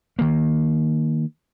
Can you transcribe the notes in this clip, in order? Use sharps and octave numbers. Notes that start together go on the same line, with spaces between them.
D#3 A#3